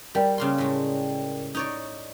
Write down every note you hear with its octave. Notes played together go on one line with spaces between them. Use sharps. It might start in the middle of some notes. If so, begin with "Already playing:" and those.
G3 A#4 D5 G5
C#3 A#3 C6
A2 G#3
D#4 C#5 D5